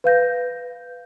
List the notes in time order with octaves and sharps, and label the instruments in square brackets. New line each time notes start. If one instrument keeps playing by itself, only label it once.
[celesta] B4 F5 G6 A#6